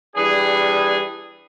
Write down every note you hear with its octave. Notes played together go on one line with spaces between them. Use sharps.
E3 G3 D4 G#4